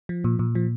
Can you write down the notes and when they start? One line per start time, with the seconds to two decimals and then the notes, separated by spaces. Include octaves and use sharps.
0.09 F3
0.24 A#2
0.39 A#2
0.55 F3